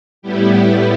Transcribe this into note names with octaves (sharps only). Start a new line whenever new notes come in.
A2 G3 B3 E4 G4